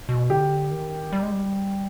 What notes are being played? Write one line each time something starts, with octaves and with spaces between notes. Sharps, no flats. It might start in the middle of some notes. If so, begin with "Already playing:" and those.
B2
D3 G4
D#3
G3
G#3
G3